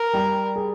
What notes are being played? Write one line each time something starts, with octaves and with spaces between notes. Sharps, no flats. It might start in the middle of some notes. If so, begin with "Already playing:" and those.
Already playing: A#4
G3
G#4